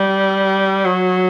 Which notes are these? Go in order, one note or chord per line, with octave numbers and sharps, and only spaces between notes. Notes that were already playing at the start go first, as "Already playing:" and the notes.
Already playing: G3
F#3